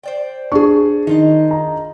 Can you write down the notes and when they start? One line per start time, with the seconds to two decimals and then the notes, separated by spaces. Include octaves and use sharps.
0.03 C5 D5 G5
0.52 D4 G#4 C#6
1.07 D#3 D#4 F4 D#5
1.51 A#5